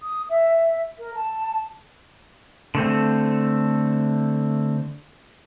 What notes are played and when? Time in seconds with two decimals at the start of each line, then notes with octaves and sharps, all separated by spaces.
0.01 D#6
0.29 E5
0.98 A#4
1.14 A5
2.75 D3 A3 C4